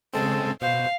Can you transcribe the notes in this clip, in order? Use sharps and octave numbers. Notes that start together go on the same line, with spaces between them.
C#3 G#3 C4 A4
B2 C5 F5